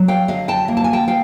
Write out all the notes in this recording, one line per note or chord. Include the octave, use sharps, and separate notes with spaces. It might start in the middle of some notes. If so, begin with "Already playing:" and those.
Already playing: F#3
F5 G5
D3 D#5 F5
G5 A5
A#3
A5
G#5
G5 A5
F5 G5